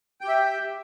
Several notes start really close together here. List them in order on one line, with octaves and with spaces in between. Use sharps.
G5 G4 E5